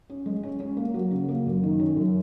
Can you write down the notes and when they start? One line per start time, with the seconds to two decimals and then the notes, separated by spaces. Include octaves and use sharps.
0.10 C#4
0.26 G#3
0.43 C#4
0.60 C#4
0.77 A#3
0.94 F#3
1.11 C#3
1.29 A#3
1.46 F#2
1.63 D#3
1.80 C#4
1.97 F#2